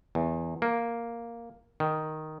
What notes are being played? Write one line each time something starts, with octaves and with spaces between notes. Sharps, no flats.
E2
A#3
D#3